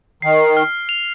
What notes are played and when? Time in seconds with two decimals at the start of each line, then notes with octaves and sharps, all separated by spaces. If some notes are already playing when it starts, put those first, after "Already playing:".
0.22 D#3 C7
0.57 F6
0.89 F7